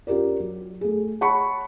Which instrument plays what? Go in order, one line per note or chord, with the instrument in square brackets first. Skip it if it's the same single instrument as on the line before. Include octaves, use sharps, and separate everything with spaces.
[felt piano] C#4 F4 G4 A#4 D5
F#3
A3 G#4
C#5 F#5 A5 B5 C#6 C#7